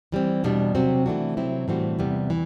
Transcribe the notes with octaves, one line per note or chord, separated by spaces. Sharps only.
E3 G3 C4
E2 B2 G3 D4
C3 F#3 C4 F#4
E3 A3 D4 F#4
C3 F#3 C4 E4
A2 E3 G3 C4 F#4
E2 C3 G3 B3
E3